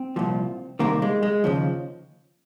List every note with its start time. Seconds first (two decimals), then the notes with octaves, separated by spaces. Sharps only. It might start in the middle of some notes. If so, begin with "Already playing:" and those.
Already playing: C4
0.16 C2 A#2 F3
0.79 C2 C3 D#3 A#3
1.02 G#3
1.23 G#3
1.44 D#2 C#3 F3